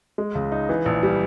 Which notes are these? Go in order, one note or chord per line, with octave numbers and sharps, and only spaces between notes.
G#3
C#2
D#4
E3
A#1
G3